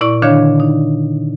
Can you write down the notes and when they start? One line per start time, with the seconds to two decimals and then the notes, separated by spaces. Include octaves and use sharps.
0.01 A#2 E4 D5 C#6
0.22 D3 D#3 D4 C#5 F5 G#6
0.60 D#4